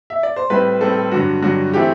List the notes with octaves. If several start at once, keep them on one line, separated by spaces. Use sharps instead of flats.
E5
D5
C5
A2 G3 C4 B4
A2 G3 C4 A4
G2 D3 F#3 F#4
G2 D3 F#3 F#4
E3 A3 C4 G4